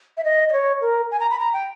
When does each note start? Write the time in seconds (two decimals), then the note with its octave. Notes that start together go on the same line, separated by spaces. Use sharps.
0.17 E5
0.24 D#5
0.49 D#5
0.53 C#5
0.81 A#4
1.11 G#5
1.20 A#5
1.30 B5
1.39 A#5
1.53 G5